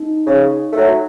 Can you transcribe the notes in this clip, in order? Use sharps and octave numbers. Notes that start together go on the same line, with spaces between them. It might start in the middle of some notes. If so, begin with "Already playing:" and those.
Already playing: D#4
C#3
F#3 A3